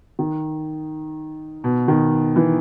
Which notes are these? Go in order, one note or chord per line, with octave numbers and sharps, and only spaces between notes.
D#3
B2
D#3
E3